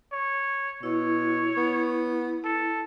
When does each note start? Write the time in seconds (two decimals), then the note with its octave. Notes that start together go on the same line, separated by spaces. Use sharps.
0.13 C#5
0.83 B2 E4 C#5
1.57 B3
2.45 A4